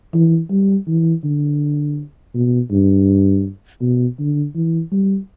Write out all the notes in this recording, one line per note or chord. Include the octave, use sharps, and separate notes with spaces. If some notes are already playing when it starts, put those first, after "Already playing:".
E3
G3
E3
D3
B2
G2
B2
D3
E3
G3